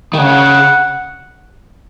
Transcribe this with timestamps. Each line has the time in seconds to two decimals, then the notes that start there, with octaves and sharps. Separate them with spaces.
0.13 D#3
0.18 C#3 F#5